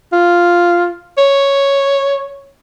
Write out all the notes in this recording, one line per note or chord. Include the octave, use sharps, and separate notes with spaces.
F4
C#5